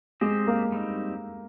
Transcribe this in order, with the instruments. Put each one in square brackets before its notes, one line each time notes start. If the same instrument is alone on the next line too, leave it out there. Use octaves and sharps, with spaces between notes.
[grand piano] G#3 G#4 [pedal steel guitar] C4 G4 C5 D#5
[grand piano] A#3 A#4
[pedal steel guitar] G3 C4 D#4